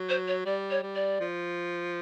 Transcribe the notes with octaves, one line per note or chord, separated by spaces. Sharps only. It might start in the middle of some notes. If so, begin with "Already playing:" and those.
Already playing: F#3
C5
C#5
G3 D5
C#5
G3
D5
F3